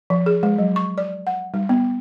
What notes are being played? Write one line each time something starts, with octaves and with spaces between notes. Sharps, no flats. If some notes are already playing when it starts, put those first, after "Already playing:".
F3
G#4
G#3
F#3
C#6
D5
F#5
G3
B3